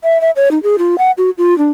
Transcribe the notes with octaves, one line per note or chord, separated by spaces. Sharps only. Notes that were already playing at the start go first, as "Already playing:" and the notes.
E5
E5
C#5
D#4
G#4
F4
F#5
F#4
F4
D4